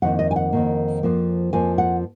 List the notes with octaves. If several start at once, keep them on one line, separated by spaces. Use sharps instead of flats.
F2 D#3 A#3 F#5
D#5
G#5
F#5
F2 D#3 A#3
F2 F3 A#3
F2 F3 A#3 G#5
F#5